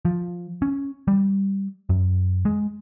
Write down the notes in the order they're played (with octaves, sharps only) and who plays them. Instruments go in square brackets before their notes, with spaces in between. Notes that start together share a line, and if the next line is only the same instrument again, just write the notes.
[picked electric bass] F3
C#4
G3
F#2
G#3